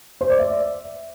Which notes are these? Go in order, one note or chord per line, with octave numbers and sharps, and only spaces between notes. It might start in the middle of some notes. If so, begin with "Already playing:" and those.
C5
D5
E5